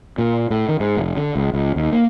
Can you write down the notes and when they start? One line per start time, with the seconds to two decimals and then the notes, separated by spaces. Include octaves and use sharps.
0.18 A#2
0.50 A2
0.69 D#3
0.80 G#2
0.97 F1
1.17 D3
1.36 C#2
1.54 C#2
1.76 D#2
1.92 A#3